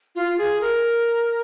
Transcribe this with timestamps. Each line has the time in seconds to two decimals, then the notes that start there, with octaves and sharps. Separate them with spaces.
0.15 F4
0.38 G#4
0.61 A#4